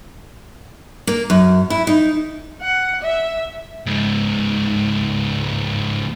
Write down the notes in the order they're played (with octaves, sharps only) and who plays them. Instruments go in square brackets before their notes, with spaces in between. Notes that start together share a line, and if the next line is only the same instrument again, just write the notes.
[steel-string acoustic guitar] A#3
F#2
E4
D#4
[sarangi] F#5
E5
[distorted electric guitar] C#2 G#2